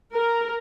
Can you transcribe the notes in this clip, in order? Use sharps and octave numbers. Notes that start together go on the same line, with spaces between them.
A#4